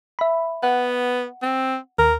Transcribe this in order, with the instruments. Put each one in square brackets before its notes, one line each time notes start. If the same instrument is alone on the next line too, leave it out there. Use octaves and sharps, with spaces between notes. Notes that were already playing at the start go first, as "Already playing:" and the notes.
[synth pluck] E5 B5
[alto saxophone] B3 [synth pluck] F#5
[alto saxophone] C4
[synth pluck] D#2 [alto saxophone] A#4